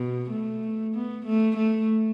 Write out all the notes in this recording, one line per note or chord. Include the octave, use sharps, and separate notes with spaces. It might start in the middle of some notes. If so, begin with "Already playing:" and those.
Already playing: B2
A3
B3
A3
A3